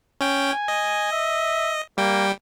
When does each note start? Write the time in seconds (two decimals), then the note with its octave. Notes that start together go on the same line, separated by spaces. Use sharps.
0.21 C#4 G5
0.51 G#5
0.68 D#5
1.12 E5
1.98 G3 A#3 G5